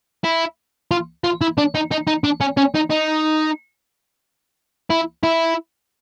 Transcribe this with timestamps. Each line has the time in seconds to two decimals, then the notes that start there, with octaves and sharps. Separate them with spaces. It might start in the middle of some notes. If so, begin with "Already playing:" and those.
0.24 E4
0.91 F4
1.24 F4
1.41 E4
1.58 D4
1.75 D#4
1.91 D#4
2.07 D#4
2.24 D4
2.41 C#4
2.57 C#4
2.74 D#4
2.90 D#4
4.90 E4
5.23 E4